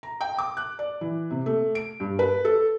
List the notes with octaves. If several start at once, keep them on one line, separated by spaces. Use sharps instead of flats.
A#5
G5
D6
F#6
D5
E3
C3
A3
D7
G2
B4
A4